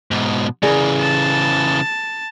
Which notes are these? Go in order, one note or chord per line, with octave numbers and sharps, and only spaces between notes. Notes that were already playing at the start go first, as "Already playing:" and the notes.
G#2 B2
C#3 E3 G#4 A#4 D5
A5